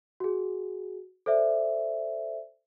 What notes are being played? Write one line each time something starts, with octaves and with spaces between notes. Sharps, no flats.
F#4 G#4
A4 C5 D5 E5